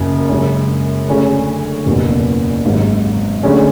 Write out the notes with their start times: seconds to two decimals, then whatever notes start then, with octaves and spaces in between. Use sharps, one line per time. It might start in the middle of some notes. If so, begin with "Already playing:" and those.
Already playing: F#1 F#2 C#3
0.28 F#2 C#3 G#3 C#4
1.08 D2 D3 A3 C#4 G#4
1.86 F#1 E2 B2
2.65 G#1 G#2 F#3
3.43 D2 D3 G#3 C#4